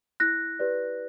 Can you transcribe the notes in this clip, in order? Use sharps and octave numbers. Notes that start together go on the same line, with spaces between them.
E4 F#6 A#6
G4 B4 D5